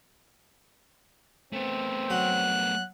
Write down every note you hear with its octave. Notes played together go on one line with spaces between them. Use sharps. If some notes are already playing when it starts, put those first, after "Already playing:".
A3 B3 C4
F#3 F#6